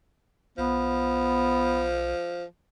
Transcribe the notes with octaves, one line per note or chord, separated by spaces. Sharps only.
B1 F3 B3